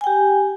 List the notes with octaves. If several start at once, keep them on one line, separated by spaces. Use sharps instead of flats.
G4 G5 G#5